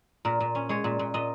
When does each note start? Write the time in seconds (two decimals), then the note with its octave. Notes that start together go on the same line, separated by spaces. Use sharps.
0.25 A#2 A#4
0.40 A#2
0.55 C#4
0.69 G#3 C#5
0.84 A#2
0.99 A#2
1.14 A#2 D#5